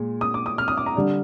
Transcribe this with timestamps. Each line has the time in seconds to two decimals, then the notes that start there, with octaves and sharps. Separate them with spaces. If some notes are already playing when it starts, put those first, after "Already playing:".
Already playing: A#2 G#3
0.21 D#6
0.34 D6
0.46 D#6
0.58 F6
0.68 D#6
0.77 D6
0.86 A#5
0.95 D3 G3 D4